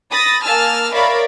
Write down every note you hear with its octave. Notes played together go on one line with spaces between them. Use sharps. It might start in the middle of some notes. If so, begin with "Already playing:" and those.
B5 D#6 A6 A#6
A#3 G#5 A5 E6 F6
A#4 C#5 D5 E5 F5 B5